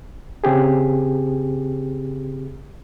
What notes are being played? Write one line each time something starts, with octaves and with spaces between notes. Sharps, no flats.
C#3 C4 G4 G#4